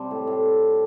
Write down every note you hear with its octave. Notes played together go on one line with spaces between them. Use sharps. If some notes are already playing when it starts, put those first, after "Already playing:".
Already playing: C3 G3 C4 A5
A2
A2